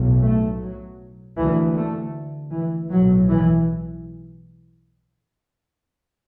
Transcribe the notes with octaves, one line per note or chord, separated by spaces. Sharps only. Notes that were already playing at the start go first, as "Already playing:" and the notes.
Already playing: B1 A2
A3
F#3
D2 E3
A3
E3
B1 A2 F#3
E3